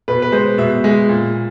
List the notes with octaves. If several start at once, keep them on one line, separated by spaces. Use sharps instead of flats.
B2 B4
B4
G#3 C5
B2 E5
G#3
A#2